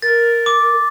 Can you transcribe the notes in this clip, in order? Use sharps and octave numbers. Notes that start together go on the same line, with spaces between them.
A#4 A6
D6